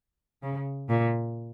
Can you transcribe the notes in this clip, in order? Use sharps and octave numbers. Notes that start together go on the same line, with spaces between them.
C#3
A#2